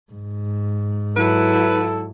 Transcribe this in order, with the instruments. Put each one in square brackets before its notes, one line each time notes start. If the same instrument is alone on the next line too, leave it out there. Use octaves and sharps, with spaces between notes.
[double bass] G#2
[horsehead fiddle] F#3 E4 [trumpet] A4 [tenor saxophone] B4